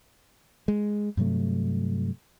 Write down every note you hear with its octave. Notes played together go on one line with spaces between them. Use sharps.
G#3
G2 C3 F#3 A3